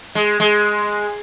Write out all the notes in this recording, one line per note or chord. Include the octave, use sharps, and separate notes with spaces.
G#3
G#3